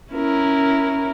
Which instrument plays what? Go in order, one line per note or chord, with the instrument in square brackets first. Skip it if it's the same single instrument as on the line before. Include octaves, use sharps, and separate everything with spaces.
[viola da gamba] C#4 E4 A#4